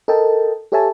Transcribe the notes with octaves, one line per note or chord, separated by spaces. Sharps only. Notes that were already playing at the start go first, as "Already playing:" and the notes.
A4 A#4 D#5 G5 A5
G4 A4 C#5 E5 G#5 A5